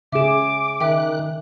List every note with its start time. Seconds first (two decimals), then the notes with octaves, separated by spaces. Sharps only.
0.12 C#3 C#4 G#4 E5 D6 E7
0.80 D#3 E5 G5 F#6